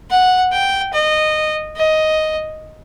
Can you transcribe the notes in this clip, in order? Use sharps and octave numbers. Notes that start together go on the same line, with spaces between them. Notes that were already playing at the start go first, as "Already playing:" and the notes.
F#5
G5
D#5
D#5